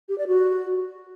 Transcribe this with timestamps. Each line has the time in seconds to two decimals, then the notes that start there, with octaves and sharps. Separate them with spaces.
0.09 G4
0.18 D5
0.27 F#4